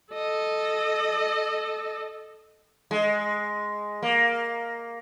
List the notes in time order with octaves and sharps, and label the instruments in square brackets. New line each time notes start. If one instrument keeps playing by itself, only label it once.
[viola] A4 D#5
[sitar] G#3
A#3